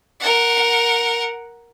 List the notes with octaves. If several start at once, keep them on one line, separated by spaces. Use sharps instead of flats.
A#4 F#5